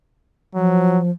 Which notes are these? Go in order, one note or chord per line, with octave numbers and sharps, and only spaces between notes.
F3 F#3